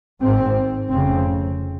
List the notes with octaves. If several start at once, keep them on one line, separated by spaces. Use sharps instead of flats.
G#1 G#2 C4
F1 F2 C#3 C4